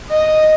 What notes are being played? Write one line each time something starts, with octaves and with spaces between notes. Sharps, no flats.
D#5